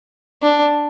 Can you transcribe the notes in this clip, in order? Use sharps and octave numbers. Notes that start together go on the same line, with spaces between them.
D4